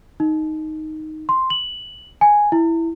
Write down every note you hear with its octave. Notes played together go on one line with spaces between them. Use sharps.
D#4
C6
F#7
G#5
E4